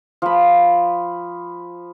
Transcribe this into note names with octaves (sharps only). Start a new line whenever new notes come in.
F3 B5